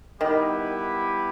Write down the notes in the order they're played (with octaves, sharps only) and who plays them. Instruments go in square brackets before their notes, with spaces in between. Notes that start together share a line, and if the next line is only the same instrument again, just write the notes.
[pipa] D#3 [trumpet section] G3 B3 E4 G4 B4